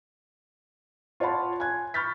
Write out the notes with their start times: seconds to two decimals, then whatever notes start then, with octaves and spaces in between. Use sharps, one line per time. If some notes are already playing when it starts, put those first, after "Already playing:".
1.20 F4 C#5 F#5 A5 B5
1.60 G#5 F#6 G#6
1.94 B5 C#6 F6 G6 A6 B6